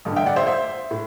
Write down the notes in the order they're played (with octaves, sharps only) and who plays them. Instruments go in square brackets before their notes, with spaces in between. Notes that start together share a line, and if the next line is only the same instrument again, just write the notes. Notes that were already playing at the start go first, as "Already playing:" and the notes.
[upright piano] A1 G2 D3
E5 G5
D5 F#5
C5 E5
C5 E5
A2